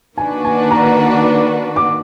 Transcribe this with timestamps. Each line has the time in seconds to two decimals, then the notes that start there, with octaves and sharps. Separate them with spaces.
0.18 D#3 A#3 D4 F#4 B4 G#5
0.45 G#5
0.71 A#5
1.76 D6